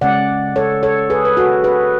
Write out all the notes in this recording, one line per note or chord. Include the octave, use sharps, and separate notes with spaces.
C#3 G#3 C#4 D5 F#5
A4 C#5
A4 C#5
G#4 B4
B4
F#4 A4
G#4 B4